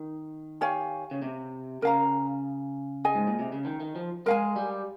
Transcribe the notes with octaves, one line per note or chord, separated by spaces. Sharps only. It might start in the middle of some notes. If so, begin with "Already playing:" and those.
Already playing: D#3
G4 C#5 F5 G#5
C#3
C3
C#3 A#4 F5 A#5
G#4 D#5 G#5
G#2
A#2
C3
C#3
D#3
D#3
F3
G#3 A#4 F5 G#5
G3